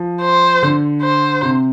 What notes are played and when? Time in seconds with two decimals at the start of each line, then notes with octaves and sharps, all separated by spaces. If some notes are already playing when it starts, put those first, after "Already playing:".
Already playing: F3
0.22 C5
0.63 D3
1.02 C5
1.42 C3